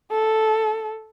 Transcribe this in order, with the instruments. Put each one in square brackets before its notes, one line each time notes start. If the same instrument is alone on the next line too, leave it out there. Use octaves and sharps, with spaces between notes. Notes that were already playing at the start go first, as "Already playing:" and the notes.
[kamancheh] A4